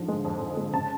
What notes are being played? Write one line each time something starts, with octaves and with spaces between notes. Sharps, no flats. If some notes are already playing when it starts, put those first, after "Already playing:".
Already playing: G#2 D3 F3
G#3
F2
F2
G#3
C#3 A5